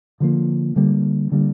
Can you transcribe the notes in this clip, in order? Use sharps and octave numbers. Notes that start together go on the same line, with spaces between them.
D3 F3 A#3
D3 G3 A#3
D3 G3 A#3